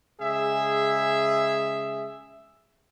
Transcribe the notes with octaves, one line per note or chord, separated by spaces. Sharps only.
C#3 G#3 G#4 E5